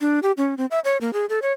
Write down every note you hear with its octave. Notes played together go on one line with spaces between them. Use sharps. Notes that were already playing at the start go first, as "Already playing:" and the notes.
D4
G4
C#4
C4
E5
C#5
A#3
G#4
A4
C#5